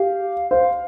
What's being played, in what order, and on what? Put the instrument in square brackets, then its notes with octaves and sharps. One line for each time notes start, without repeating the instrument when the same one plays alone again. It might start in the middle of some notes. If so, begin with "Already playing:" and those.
Already playing: [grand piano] G4 [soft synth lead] F5
[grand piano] C5 [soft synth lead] F5